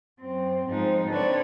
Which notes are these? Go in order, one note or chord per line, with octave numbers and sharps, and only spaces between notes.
F#2 C4
G#2 F3 G#3 C4 D#4
D3 C4 A4 B4 C#5 D5